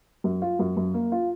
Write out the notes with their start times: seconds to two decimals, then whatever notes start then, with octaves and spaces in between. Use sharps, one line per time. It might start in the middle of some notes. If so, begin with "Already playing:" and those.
0.24 F#2
0.42 F4
0.59 F#2
0.77 F#2
0.94 A#3
1.12 F4